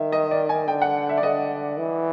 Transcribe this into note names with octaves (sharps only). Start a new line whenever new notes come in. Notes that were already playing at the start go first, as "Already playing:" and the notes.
Already playing: D#3 E5
D#5
D5
G#5
D3 G5
F#5
E5
D5
D3 D#5
E3